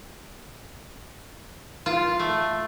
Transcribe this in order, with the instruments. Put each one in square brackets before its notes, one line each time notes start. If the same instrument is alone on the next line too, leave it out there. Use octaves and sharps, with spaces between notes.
[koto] F4
A3